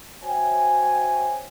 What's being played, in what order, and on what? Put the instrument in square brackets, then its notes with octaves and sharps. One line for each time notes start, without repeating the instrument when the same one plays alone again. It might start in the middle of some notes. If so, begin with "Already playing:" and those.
[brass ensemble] F#4 C5 C#5 E5 G5 G#5